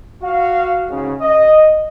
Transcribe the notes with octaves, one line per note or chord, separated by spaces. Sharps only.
F#4 F5
G#2 C#3
D#5